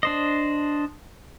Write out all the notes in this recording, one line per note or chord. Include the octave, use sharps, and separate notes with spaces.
D4 C5 D#5